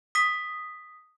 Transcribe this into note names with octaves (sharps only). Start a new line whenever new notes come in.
D#6 B6